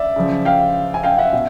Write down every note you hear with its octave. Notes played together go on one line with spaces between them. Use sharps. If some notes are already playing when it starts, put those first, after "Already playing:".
Already playing: D5 E5
C#3 F3
F5 G5
G#5
F5 G5
E5 F#5
B2